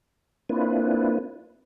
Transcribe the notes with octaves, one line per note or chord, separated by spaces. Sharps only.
A#3 C4 D4 E4 F4 B4